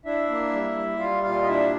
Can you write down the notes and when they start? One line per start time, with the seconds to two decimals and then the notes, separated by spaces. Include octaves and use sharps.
0.05 D4 E4 E5
0.29 A#3
0.52 G3
0.76 G3
0.99 G3 F4 F5
1.23 A#2 F4 F5
1.42 D#5
1.47 D4 E4 E5